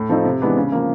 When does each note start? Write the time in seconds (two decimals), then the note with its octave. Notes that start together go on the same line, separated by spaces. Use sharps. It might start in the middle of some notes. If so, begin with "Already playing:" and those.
Already playing: A2
0.09 F3 A3 C4 D#4
0.25 C3
0.41 E3 G#3 B3 D4
0.57 C#3
0.72 F3 A#3